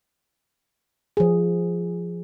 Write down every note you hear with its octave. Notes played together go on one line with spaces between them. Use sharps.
F3 G#4